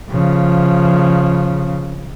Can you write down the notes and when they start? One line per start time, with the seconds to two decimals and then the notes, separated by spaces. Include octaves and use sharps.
0.10 C#3 F3